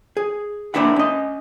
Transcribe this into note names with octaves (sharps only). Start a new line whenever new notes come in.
G#4
A#3 C4 D4 E4 E5 F#5
C#4 D#5